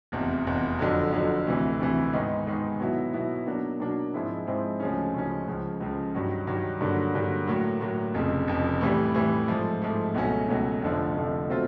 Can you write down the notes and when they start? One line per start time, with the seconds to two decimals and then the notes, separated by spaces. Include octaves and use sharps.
0.12 F1 E2 C3
0.47 F1 E2 C3
0.79 F2 D3 F#3
1.12 F2 D3 F#3
1.47 D2 C3 E3
1.80 D2 C3 E3
2.13 G#2 D#3 G#3 B3 D#4
2.47 G#2 D#3 G#3 B3 D#4
2.80 B2 F#3 B3 E4
3.13 B2 F#3 B3 E4
3.46 B2 F#3 A#3 D4
3.80 B2 F#3 A#3 D4
4.14 G#2 F3 G#3 C4 E4
4.47 G#2 F3 G#3 C4 E4
4.80 D2 C#3 F3 G#3 C#4
5.14 D2 C#3 F3 G#3 C#4
5.48 C#2 C#3 F3
5.80 C#2 C#3 F3
6.15 G2 D#3 F#3
6.47 G2 D#3 F#3
6.81 G2 D3 F#3 A#3
7.15 G2 D3 F#3 A#3
7.48 A2 F#3 A#3
7.81 A2 F#3 A#3
8.14 F1 F2 C#3
8.48 F1 F2 C#3
8.81 A2 E3 G3
9.15 A2 E3 G3
9.48 G#2 F3 A3
9.82 G#2 F3 A3
10.14 C#2 B2 F#3 A3 C#4
10.48 C#2 B2 F#3 A3 C#4
10.81 F1 F2 D3 F3 A3
11.15 F1 F2 D3 F3 A3
11.48 B2 F#3 A3 C4 F4